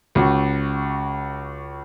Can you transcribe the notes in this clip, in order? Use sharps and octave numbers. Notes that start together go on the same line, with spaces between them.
C#2 F#4